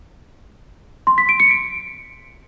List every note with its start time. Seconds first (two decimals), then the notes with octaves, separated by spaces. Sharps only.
1.07 C6
1.18 B6
1.29 D7
1.40 C#7
1.51 D7